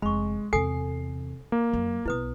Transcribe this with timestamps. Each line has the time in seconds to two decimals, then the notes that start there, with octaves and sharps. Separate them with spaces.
0.02 F1 G#3 B5 C#6
0.53 E2 C3 A4 G#5 D#6 C7
1.52 A#3
1.73 F#2 F#3
2.06 B1 B3 E4 B4 D#6